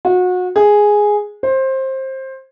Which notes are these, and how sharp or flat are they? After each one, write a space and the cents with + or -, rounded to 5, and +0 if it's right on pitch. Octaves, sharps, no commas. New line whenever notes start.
F#4 -30
G#4 +0
C5 +20